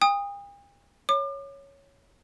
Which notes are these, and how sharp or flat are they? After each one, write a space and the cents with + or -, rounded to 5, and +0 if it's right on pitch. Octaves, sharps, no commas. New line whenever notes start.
G5 +45 D#6 +0
C#5 +0 D6 +35